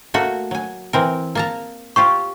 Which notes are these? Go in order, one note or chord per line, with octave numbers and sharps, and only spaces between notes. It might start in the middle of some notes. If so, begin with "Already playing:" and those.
A3 A#3 F#4
F#3 G#5
E3 C4 A#4
A#3 A5 A#5
F4 G4 C5 C#6